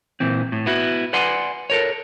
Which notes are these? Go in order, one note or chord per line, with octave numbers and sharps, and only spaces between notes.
A#2 E3 C4
A2
B3 E4 F#4
B4 D5 F#5 G#5 C6
A4 A#4 C#5